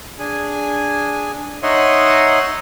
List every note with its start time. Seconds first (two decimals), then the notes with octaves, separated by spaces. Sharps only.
0.19 D4 G#4 G#5
1.63 D#4 C#5 D#5 E5 F#5 C6